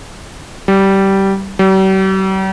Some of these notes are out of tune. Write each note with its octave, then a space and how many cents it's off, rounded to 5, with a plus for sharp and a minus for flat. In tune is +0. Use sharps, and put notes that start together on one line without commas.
G3 -15
G3 -45